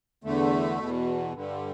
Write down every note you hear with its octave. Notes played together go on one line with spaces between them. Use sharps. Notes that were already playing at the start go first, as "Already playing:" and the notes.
E2 D3 A3
E2 B2
G2 D3